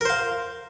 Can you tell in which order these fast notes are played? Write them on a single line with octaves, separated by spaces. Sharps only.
A#4 C5 F5